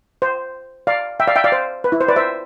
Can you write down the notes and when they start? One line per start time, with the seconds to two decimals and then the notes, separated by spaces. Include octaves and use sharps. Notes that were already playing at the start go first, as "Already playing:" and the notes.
0.22 C5
0.87 D5 F5
1.20 E5 G5
1.27 D5 F5
1.36 E5 G5
1.44 D5 F5
1.52 C5
1.84 B4
1.92 E4
2.01 C5
2.08 B4 D5
2.16 C5 E5